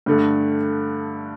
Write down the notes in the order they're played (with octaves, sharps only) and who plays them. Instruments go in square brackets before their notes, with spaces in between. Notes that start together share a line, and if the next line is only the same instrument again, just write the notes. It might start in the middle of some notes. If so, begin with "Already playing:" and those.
[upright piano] G2 D3 A3